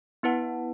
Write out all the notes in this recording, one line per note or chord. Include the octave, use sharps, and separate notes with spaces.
B3 E4 B4 F#5 A5